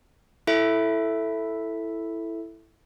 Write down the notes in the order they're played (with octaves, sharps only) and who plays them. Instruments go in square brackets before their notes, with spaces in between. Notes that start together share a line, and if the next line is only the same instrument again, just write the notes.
[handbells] E4 A4 E5